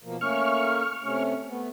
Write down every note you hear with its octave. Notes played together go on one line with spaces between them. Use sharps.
B2 F3 A#3
A3 A#3 C#4 C#6 F6
C3 A3 C#4
A3 B3